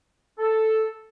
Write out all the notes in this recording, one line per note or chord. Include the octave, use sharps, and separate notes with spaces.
A4